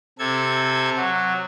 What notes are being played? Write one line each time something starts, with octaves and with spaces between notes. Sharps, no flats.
C3 A4 G#6
F#3